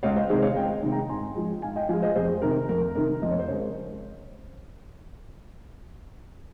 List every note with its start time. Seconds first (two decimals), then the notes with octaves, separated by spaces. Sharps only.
0.03 C#2 C#5 F5
0.16 C5 D#5
0.29 C3 D#3 G#3 G#4 C5
0.42 C#5 F5
0.56 C#2 D#5 G5
0.83 C3 D#3 G#3
0.91 G5 A#5
1.09 G#2 G#5 C6
1.35 F3 G#3
1.62 G#2 F5 G#5
1.76 D#5 G5
1.89 F3 F5 G#5
1.93 G#3
2.02 C5 D#5
2.16 F2 G#4 C5
2.42 C3 D#3 A#4
2.69 F2 A#4
2.95 C3 D#3 A#4
3.22 F2 D#5
3.31 C#5
3.39 C5
3.48 C#3 G#3 A#4 C#5